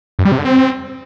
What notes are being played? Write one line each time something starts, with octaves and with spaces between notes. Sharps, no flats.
F#2
G3
C3
D3
C4